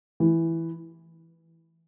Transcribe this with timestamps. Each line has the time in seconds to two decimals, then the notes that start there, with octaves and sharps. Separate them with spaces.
0.20 E3